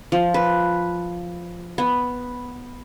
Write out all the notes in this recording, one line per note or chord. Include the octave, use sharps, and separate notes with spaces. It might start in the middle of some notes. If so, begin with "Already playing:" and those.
F3
B4
B3